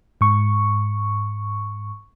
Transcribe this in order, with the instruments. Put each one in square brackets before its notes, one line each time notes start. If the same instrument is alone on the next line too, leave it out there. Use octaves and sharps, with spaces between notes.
[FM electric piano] G#2 C#6